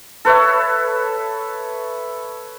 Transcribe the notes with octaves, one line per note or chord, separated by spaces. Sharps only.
A4 B4 C#5 E5